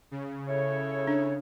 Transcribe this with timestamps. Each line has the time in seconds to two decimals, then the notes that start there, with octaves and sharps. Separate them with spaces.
0.11 C#3
0.47 E4 A4 C#5
1.07 D4